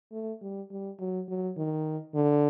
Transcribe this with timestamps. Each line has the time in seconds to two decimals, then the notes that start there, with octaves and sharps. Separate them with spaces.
0.12 A3
0.41 G3
0.71 G3
1.00 F#3
1.29 F#3
1.57 D#3
2.15 D3